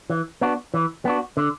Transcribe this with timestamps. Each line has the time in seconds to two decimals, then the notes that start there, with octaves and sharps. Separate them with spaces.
0.10 E3
0.41 B3 D4 F#4
0.74 E3
1.05 B3 D4 F#4
1.37 D3